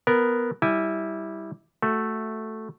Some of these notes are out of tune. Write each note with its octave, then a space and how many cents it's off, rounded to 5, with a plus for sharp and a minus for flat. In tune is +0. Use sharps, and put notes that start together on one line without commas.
B3 +0 A#4 +0
G3 +0 E4 -10 G#5 -10
A3 +0 F#4 +5